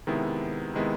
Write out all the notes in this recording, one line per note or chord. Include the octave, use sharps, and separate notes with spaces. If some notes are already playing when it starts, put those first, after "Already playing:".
C3 D#3 G#3 B3 E4
C3 D#3 G#3 B3 E4